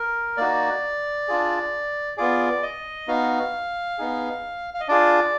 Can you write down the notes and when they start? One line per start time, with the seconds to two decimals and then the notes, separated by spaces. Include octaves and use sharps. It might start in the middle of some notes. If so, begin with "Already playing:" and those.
Already playing: A#4
0.37 A#3 D#4 F#4 D5
1.28 D4 F4 G#4
2.17 B3 F4 G#4 D5
2.62 D#5
3.08 B3 D#4 F#4 F5
3.98 B3 D#4 G#4
4.74 F5
4.80 D#5
4.88 D4 F4 G#4 D5